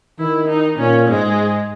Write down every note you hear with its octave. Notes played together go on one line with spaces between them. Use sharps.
D#3 E4
D#4
A#2 C#4
G#2 G#3